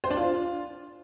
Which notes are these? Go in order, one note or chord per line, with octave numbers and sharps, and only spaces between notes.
C5
D4
F4